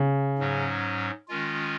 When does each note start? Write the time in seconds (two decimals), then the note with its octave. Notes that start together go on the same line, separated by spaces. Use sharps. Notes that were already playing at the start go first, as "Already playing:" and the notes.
Already playing: C#3
0.39 G#2 F#3 C#4
1.28 D#3 G#3 C#4 F4